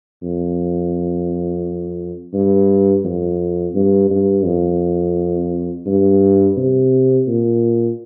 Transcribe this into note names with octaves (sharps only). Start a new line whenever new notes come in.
F2
G2
F2
G2
G2
F2
G2
C3
A#2